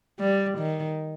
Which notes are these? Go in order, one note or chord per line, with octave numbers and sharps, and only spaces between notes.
G3
D#3